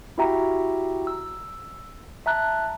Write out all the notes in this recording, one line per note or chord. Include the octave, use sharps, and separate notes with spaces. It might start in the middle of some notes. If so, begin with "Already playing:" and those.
E4 F#4 G4 E5 G5 A#5
E6
E5 A5 A#5 F#6